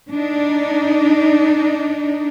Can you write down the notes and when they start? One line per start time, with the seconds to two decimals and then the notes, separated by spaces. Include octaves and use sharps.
0.11 D4 D#4